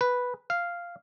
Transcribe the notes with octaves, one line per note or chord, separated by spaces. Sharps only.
B4
F5